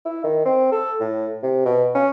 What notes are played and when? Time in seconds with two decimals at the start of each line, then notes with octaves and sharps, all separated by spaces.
0.05 E4
0.24 D#3
0.45 C4
0.72 A4
1.00 A2
1.43 C3
1.65 B2
1.95 C#4